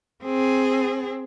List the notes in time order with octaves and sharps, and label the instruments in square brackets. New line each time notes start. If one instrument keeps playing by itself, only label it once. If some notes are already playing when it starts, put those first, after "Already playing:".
[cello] C4 G#4